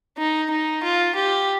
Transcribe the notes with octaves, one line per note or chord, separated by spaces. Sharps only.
D#4
D#4
F4
G4